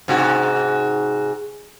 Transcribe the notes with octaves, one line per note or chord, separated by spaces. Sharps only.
G#2 C3 F#4